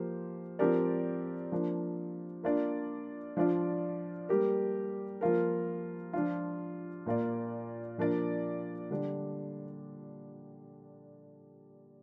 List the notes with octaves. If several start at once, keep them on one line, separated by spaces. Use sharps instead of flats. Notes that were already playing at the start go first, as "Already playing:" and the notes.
Already playing: F3 A#3 G4 C5
F3 C4 G4 A#4 D5
F3 A#3 D4
A#3 D4 F4 D5
F3 D4 F4 D5
G3 A#3 G4 A#4
F3 A#3 F4 A#4
F3 D4 F4
A#2 A#3 F4 D5
A#2 F3 D4 A#4 D5
D3 G3 D4